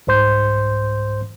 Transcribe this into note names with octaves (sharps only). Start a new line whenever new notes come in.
C2 G#2 C5 C6 G6